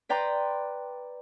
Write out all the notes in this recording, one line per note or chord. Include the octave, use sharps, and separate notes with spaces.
B4 D5 G5 A#5 C6